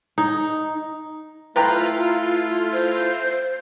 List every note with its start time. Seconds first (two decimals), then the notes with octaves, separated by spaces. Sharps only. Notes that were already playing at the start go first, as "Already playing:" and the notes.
0.18 D#4
1.56 A3 E4 F4 B4 G5 A#5
2.73 C5